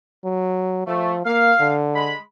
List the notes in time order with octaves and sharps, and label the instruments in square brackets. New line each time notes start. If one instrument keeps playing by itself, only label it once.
[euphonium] F#3
[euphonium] F3 [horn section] A3
[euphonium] A#3 [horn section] F5
[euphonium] D3
[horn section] G#3 B5